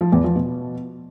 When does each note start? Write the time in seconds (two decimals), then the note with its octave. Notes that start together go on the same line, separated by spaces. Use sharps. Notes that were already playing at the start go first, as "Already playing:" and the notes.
0.01 F3
0.12 E2
0.24 F3
0.36 B2